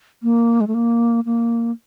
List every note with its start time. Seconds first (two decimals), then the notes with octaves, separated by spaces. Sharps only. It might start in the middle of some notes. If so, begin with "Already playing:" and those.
0.23 A#3
0.61 G#3
0.67 A3
0.74 A#3
1.26 A#3